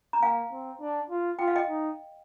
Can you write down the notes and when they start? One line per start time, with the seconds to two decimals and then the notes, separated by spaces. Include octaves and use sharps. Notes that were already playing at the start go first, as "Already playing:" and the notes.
0.13 A#5
0.22 A#3 F5 G#5
0.51 C4
0.80 D4
1.10 F4
1.39 F4 G5
1.48 F5
1.56 D#5 G5
1.69 D#4